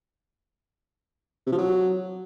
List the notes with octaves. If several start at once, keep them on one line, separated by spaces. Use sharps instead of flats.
C3
F3
F#3